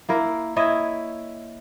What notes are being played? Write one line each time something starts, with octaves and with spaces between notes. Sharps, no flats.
A#3 E4 A#4
E4 C#5 D#5 E5